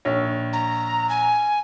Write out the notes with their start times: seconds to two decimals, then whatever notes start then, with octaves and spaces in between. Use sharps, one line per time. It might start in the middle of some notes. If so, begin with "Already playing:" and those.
0.05 A#1 C#5
0.53 A#5
1.09 G#5